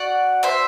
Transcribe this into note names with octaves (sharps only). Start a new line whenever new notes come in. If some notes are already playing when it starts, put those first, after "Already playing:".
Already playing: F#4 D5 F#5
C5 E5